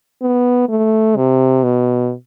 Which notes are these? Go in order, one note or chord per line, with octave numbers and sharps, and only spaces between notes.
B3
A3
C3
B2